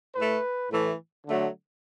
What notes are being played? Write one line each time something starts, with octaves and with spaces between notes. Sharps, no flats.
A2 A3 B4
A2 E3 A3
D3 F#3 A3